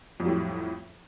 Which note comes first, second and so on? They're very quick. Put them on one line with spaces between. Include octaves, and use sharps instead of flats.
F2 G3 F#3 A2